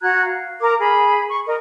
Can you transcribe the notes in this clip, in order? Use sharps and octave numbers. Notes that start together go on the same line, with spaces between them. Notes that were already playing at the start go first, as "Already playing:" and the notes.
F#4 A#5 F#6 G#6
F5
A#4 A#5 D6
G#4 B5
C#6
A#4 D#5